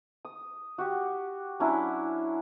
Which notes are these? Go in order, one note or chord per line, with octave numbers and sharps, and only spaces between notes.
D#6
F#4 G4
F#3 C#4 D4 E4